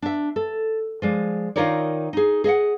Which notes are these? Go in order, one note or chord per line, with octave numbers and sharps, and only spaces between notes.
D4 E5
A4
F3 G#3 D5
D#3 D#4 F4 A#4 C#5 D5
D#4 G#4
G#4 D#5 E5 F#5